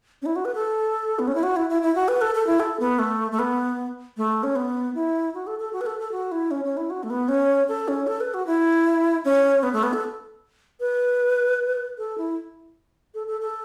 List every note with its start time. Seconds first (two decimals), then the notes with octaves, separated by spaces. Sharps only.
0.22 C#4
0.26 E4
0.36 F#4
0.45 B4
0.55 A4
1.19 B3
1.28 C#4
1.35 E4
1.43 F#4
1.56 E4
1.70 E4
1.82 E4
1.95 F#4
2.08 B4
2.21 A4
2.35 A4
2.47 E4
2.60 A4
2.80 B3
2.99 A3
3.32 A3
3.39 B3
4.17 A3
4.43 C#4
4.56 B3
4.95 E4
5.34 F#4
5.47 A4
5.60 A4
5.73 F#4
5.81 B4
5.86 A4
5.99 A4
6.12 F#4
6.32 E4
6.51 C#4
6.65 C#4
6.77 E4
6.90 F#4
7.03 A3
7.10 B3
7.28 C#4
7.68 A4
7.88 C#4
8.07 A4
8.20 B4
8.34 F#4
8.47 E4
9.25 C#4
9.63 B3
9.73 A3
9.83 B3
9.93 A4
10.80 B4
11.98 A4
12.18 E4
13.15 A4
13.27 A4
13.41 A4